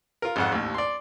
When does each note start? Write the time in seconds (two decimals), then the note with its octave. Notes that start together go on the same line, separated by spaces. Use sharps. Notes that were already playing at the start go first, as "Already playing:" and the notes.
0.22 F4 A#4
0.36 G#1 F2 F#5
0.52 A1 D#2
0.74 D5 C6